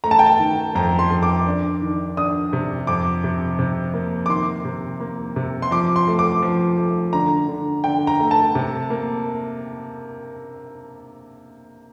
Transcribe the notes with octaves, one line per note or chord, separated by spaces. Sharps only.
A3 A#5
A5
G5
A5
D#3
F2 A#5
C6
F2
D6
D4
D#3
D4 D#6
C3
F2 D6
C3
C3
A#3
D6
D#3 C6
C3
A#3
C3
C6
F3 D6
C6
A3
D6
F3
A3
D3 A#5
D3
D3 G5
A#5
A3
A5
C3
A#3